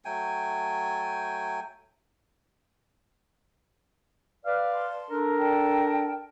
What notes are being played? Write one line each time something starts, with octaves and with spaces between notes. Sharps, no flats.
F#3 A3 G5 G#5
B4 D5 F5
A5 C6
D4 A4 A#4
D5 G5 A5